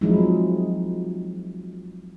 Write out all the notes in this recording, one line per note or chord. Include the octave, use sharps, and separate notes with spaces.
F3 F#3 G#3 C4 D#4 E4